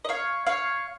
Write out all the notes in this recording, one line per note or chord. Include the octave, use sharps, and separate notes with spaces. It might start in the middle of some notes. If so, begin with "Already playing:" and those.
D#5
C#5 F5
C#5 F5